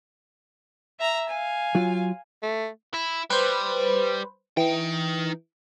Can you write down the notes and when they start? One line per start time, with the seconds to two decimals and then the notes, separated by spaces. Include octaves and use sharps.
0.99 E5 A#5
1.29 F5 G#5
1.75 F#3 F4
2.43 A3
2.94 E4
3.30 G3 B4 C5
4.57 E3 D#4 G5